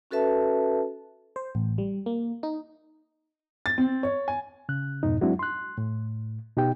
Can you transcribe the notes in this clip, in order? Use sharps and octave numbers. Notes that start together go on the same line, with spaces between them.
C#4 F#4 A4 B4 E5 A5
C5
A1
G3
A#3
D#4
A6
C4
C#5
G#5
C#3 F#6
F2 G#2 B2 D#4
F#3 G#3 C4 D4 E4 F#4
C6 F#6
A2
B2 D#4 G4 G5